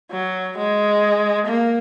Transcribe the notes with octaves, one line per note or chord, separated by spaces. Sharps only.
F#3
G#3
A#3